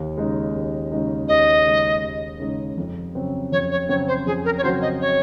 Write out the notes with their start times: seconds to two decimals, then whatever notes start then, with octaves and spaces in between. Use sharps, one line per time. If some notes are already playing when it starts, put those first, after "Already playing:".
Already playing: D#2
0.18 C#3 G#3 D#4
0.55 D#2
0.92 C#3 G#3 D#4
1.28 D#2 D#5
1.66 C#3 G#3 D#4
2.04 D#2
2.40 C#3 G#3 D#4
2.78 F2
3.15 C#3 F#3 C4 F#4
3.52 F2 C#5
3.71 C#5
3.89 C#3 F#3 C4 F#4 C#5
4.08 C5
4.26 F2 G#4
4.45 A#4
4.58 C#5
4.63 C#3 F#3 C4 F#4 C5
4.81 D#5
5.01 C#5